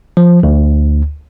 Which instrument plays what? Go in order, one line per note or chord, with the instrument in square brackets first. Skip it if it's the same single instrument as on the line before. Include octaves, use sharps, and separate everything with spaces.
[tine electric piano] F3
D2